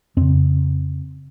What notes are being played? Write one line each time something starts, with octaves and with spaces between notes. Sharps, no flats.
F2 C#3 C4